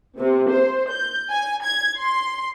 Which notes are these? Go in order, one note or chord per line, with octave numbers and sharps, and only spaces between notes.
C3
C5
G6
G#5
G#6
C6